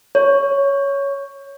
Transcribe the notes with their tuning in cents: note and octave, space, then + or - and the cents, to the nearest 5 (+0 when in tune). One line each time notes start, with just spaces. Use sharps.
C#5 +5